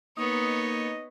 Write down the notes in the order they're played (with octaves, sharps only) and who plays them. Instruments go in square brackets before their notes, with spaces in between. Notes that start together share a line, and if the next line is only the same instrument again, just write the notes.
[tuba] A#3 [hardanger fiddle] B3 C#5 [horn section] D#4 D#5